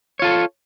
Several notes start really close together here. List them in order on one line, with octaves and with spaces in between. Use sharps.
C#5 F4 A4